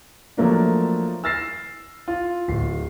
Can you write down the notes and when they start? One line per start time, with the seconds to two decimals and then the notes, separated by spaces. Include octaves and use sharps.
0.37 F3 F#3 A3 A#3 D4
1.24 E6 F6 A6 A#6 C7 E7
2.08 F4
2.48 D1 C7